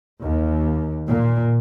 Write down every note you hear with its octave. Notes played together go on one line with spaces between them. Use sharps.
D#2
A#2